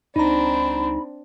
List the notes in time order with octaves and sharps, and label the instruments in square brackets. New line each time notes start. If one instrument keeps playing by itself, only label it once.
[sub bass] C#2 [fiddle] C4 D4 [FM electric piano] D#4 A#5 [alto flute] B5